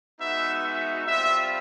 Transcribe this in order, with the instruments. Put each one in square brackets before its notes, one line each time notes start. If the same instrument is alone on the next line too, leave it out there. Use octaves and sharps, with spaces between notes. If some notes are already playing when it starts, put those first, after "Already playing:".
[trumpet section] G#3 B3 D#4 F#4 E5
E5
G3 C4 F4 E5